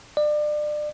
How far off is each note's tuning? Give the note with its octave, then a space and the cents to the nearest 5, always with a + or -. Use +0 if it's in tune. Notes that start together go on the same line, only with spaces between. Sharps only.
D5 +30